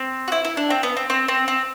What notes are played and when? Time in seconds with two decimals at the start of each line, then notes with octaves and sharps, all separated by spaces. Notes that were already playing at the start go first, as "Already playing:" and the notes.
Already playing: C4
0.28 F#4
0.32 E4
0.45 E4
0.57 D4
0.70 C4
0.83 B3
0.97 C4
1.10 C4
1.28 C4
1.48 C4